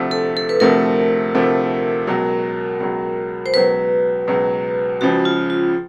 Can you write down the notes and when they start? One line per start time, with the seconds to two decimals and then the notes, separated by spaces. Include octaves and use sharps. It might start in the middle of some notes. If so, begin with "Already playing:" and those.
Already playing: D2 C3 F3 A3
0.11 A4
0.37 A4
0.49 B4
0.60 D2 C3 F3 A3 A#4
1.35 D2 C3 F3 A3
2.07 C#2 B2 F#3
2.80 C#2 B2 F#3
3.46 C5
3.54 C#2 B2 F#3 B4
4.27 C#2 B2 F#3
5.01 C#2 C#3 F3 F#4
5.25 F4
5.50 F4